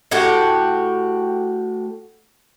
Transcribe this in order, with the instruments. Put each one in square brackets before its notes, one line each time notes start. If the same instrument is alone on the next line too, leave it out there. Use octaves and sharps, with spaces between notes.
[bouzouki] A2 F#4 G4